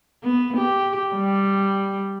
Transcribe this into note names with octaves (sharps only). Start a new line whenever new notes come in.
B3
G4
G3